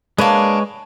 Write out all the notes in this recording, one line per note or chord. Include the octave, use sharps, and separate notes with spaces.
G#3 A#3 D4 B4 C#5